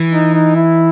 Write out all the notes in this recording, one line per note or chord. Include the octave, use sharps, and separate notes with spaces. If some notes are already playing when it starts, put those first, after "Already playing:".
Already playing: E3
D#4
D#4
E4